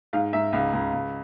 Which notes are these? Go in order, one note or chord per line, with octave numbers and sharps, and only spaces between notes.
G#2 F5
G#2 E5
C#2 F5
C#2
C#2